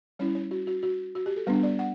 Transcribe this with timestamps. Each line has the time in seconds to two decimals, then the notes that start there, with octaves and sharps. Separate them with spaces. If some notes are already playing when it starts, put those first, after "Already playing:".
0.19 G3 C#4 E4 C#5
0.35 C#5
0.51 F#4
0.67 F#4
0.83 F#4
1.15 F#4
1.26 G4
1.36 A4
1.47 G3 B3 D4 B4
1.63 D5
1.79 F#5